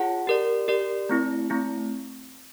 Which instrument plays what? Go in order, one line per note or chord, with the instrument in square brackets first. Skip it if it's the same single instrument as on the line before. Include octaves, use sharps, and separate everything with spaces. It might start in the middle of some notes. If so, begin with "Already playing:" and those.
Already playing: [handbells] F4 G#4 C#5 F#5 A5
G4 A#4 D5
G4 A#4 D5
A3 C4 E4
A3 C4 E4